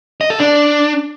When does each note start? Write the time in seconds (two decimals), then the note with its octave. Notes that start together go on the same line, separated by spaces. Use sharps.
0.21 D#5
0.30 A4
0.40 D4